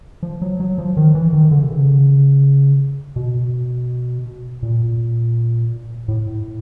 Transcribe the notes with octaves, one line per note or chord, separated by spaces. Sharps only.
F3
F#3
F#3
F3
D#3
E3
D#3
D3
C3
C#3
B2
A#2
A2